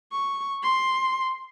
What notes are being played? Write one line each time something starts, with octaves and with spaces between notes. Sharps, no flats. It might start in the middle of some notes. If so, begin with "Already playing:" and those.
C#6
C6